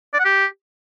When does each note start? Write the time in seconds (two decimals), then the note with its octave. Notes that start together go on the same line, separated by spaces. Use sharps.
0.14 D5
0.19 F#5
0.25 G4